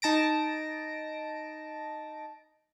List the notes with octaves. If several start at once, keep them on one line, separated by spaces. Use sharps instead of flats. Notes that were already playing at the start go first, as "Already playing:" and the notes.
D#4 A5 A#6 D7